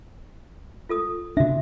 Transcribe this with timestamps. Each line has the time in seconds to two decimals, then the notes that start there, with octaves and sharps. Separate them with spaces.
0.89 F4 A4 D#6
1.37 C#3 D4 F#4 E5